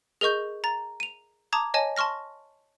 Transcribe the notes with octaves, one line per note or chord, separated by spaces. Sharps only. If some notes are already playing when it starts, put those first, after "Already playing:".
G#4 A#4 D#5 C#6 G6
A#5 A6
D#7 F7
A5 A#5 D6 D#6 G#6
C#5 D#5 G#5 A5
A5 C6 C#6 F6 A#6